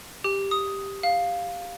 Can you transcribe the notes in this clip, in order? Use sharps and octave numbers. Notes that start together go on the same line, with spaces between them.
G4
D#6
F5